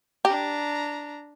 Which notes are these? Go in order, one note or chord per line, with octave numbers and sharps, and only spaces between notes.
D4 G4 A#5